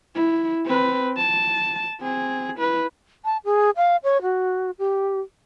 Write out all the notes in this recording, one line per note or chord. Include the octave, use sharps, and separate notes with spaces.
E4
C4 B4
A5
C4 G#4
E4 B4
A5
G#4
F5
C#5
F#4
G4